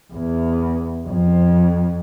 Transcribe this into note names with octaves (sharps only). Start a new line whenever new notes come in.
E2
F2